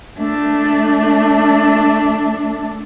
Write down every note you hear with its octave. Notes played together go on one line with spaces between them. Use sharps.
A3 D4